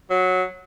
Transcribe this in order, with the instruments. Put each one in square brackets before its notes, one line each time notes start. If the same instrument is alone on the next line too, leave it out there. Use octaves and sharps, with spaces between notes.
[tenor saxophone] F#3